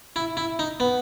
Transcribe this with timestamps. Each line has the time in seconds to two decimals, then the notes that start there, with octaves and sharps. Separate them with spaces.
0.16 E4
0.37 E4
0.59 D#4
0.80 B3